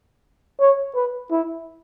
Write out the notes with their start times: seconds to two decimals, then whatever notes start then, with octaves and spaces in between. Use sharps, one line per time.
0.60 C#5
0.95 B4
1.31 E4